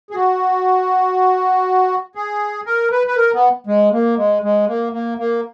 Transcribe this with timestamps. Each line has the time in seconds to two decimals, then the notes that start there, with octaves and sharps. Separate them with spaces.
0.11 G#4
0.14 F#4
2.15 G#4
2.66 A#4
2.92 B4
3.07 B4
3.16 A#4
3.34 B3
3.67 G#3
3.92 A#3
4.17 G#3
4.43 G#3
4.68 A#3
4.93 A#3
5.18 A#3